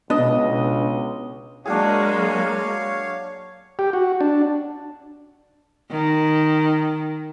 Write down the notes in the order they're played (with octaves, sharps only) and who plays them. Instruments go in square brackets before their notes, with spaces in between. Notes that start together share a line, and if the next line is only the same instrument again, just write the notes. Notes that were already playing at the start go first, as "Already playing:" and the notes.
[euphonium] C#2 [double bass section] B2 [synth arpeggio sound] B3 D4 [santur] D#5
[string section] F#3 G#3 A#3 [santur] D4 F#4 G#4 [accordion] C#5 F5
[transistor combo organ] G4
F#4
D4
[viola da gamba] D#3